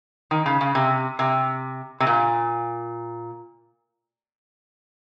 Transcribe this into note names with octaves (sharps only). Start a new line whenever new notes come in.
D#3
C#3
C#3
C3
C3
C3
A#2